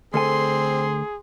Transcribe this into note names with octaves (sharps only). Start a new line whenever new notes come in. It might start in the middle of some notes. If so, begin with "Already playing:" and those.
D2 C4 G#4 A4 G#5 C6